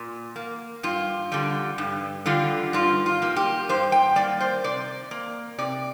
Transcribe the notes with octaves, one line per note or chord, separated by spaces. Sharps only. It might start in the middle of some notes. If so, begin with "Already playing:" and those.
Already playing: A#2
A#3
G2 F4
D3 G3
G2
D3 G3 F4
G2 F4
F4
G3 A#3
G4
G2 C5
G5
G3 A#3 D5
C5
C3 D5
A#3
C3 D5